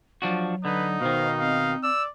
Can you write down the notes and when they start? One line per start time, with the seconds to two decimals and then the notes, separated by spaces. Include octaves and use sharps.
0.22 F3 F#3 D4 F#4
0.65 D3 D#4 B4
1.01 B2 D#3 C5 F5
1.39 C4 F5
1.83 D5 E6